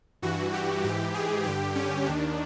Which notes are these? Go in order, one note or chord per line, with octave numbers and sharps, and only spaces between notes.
G2 E3 F#4
G4
G#2 E3 G4
G#4
G2 D3 G4
C#4
D#2 D#3 D4